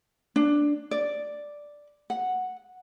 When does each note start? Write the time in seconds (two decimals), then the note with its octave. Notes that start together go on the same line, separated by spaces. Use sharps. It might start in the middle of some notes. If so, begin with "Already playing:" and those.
0.36 D4
0.91 D5
2.10 F#5